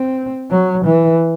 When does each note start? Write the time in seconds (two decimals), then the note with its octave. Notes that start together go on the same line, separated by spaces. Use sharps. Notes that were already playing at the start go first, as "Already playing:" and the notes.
Already playing: C4
0.51 F#3
0.86 E3